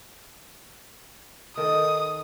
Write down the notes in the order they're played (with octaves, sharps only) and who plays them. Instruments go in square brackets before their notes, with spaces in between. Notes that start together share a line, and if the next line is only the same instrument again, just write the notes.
[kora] D#3 A4 [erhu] D#6